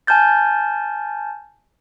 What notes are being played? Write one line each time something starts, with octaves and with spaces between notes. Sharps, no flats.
G#5 A5 F6 G6 A6